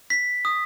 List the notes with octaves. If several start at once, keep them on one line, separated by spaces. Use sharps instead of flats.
B6
D#6